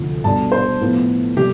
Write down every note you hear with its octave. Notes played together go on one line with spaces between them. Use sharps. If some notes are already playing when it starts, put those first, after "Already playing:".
Already playing: D2 C3 F3
B2 G3 D4 A5
C5
A2 F3 B3 F4
C3 G3 G4